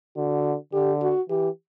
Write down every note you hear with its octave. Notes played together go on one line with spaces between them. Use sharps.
D3 F#4
D3 G4
F#4
E3 G4